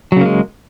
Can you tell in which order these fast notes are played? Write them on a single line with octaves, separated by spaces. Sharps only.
F#3 C#3 A#3 G#3